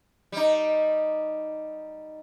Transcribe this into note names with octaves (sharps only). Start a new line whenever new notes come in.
G3 D#4